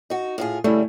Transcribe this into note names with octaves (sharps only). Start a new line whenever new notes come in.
D#4 F#4
A2 F4 G#4
C#3 G3 A3 E4